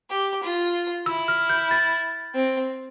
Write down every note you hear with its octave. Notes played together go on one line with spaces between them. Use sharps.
G4
F4
E4 E6
F6
G6
A6
C4